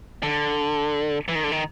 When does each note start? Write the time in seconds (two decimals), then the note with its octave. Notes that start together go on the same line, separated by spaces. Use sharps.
0.23 D3
1.28 E3
1.35 D#3
1.44 D3
1.52 D#3